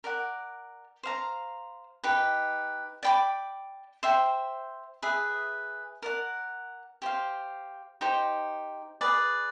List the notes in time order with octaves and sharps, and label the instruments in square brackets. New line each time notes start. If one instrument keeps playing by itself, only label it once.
[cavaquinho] A#4 D5 F#5
C5 F5 A#5
D#4 G4 B4
D5 G5 B5 D6
C5 E5 G5
G#4 B4 E5
A#4 D5 F#5
G4 C5 F5
D#4 G4 C5
G#4 B4 D5